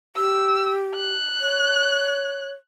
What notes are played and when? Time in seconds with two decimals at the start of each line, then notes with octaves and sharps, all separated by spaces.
0.16 G4 E6
0.95 F#6
1.40 C#5